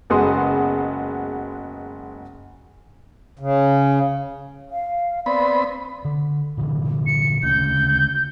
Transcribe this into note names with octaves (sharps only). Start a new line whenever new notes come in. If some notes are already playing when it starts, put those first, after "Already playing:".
F#1 G#3 B3 F#4 C6 D#6
C#3
F5
B3 C4 D5 B5
D3
A#2 D3 E3
C#7
D2 C#3 G6